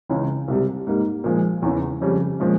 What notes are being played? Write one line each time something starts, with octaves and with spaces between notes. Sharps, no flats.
C#2 C#3 E3
C2 C3 G3
G#2 G3 A#3
A#2 F3 G#3
E2 C#3 E3
F2 C#3 G3
A#2 F3 G#3 C#4